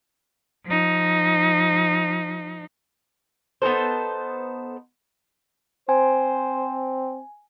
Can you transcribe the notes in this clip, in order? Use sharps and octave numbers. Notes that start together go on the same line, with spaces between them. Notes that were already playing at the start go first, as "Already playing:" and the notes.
F3 D#4
B3 D#4 A4 C5
C4 C5 G#5